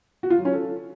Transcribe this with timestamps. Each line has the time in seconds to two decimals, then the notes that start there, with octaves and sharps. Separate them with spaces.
0.23 F#4
0.30 F4
0.38 F#3
0.45 C#4
0.52 A4